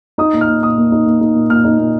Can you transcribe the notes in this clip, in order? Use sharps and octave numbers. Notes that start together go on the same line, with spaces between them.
D#4 D#6
A#2
F6
A#2
A#2 D#6
A#3
D#4
A#3
D#4
A#2
A#2 F6
D#4
A#2